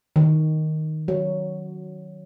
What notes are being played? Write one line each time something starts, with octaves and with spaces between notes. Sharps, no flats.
D#3
F#3